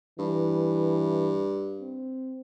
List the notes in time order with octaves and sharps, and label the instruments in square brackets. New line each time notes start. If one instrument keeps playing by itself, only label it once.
[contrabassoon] G2 [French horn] E3
[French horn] C4